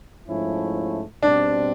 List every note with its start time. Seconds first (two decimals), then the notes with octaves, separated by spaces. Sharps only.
0.28 G#2 F3 A3 C#4 E4
1.22 B2 G3 C4 D4